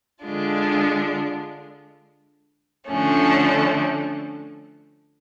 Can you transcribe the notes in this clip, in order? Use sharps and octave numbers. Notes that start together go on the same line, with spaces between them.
D3 G#3 D4 F4
D3 F3 A3 C#4